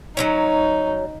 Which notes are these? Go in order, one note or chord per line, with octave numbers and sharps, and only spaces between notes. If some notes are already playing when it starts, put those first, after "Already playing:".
F#3 B3 C#4 D#4